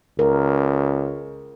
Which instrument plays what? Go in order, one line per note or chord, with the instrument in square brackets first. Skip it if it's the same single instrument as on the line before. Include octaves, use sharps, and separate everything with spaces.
[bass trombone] C#2 [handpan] A#4